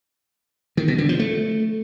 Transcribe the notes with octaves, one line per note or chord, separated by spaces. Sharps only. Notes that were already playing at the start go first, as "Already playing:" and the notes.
D#3
B2
D3
F3
A3